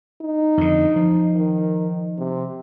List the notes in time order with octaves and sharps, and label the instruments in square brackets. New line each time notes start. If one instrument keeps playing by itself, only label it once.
[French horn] D#4
[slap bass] F2 D3
F3
[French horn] D#3
C3